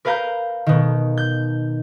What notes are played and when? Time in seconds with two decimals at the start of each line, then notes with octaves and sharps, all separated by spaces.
0.05 A#4 B4 F5 A#5 G6
0.66 B2 D#3
1.17 G6